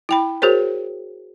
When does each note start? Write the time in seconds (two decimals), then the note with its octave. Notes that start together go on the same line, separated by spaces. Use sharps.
0.09 E4 G5 B5
0.42 F#4 G#4 A#4 C5 C#5